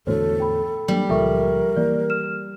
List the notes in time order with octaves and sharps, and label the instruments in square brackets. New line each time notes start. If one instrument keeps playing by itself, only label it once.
[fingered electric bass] E2 A2 D3 [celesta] F#4 C5 C#5 [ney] A4
[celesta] G5 B5
[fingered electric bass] F#3 A#3 D4 [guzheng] G3
[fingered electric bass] C#2 A#2 F3 [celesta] A4 E5 C#6 [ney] A#4
[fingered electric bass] E3 A#3 [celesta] D5
[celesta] F6 E7